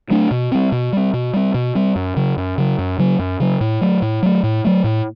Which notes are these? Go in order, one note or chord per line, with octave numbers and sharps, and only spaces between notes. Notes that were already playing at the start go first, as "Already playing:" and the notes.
F#3 A3 D4
B2
G3 C4
B2
G3 C4
B2
G3 C4
B2
G3 C4
F#2
C#3 F#3
F#2
C#3 F#3
F#2
C#3 F#3
F#2
C#3 F#3
A2
F#3 A3
A2
F#3 A3
A2
F#3 A3
A2